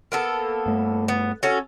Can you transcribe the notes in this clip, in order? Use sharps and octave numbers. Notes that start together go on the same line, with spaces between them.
A#3 B3 A4
G2 A3
B3
C#4 F#4 A4